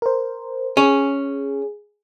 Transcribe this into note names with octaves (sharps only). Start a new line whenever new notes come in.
A#4 C5
C#4 G#4